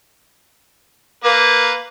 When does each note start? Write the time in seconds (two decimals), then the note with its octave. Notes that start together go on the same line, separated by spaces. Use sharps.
1.24 A#3 B4